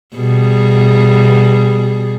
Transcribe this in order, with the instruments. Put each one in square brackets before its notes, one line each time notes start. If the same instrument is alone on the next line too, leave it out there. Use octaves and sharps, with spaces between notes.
[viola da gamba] B2 G3 G#4